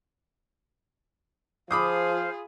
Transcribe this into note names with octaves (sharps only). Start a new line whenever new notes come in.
F3 F4 G#4 C5 F5 B5 D6 D#6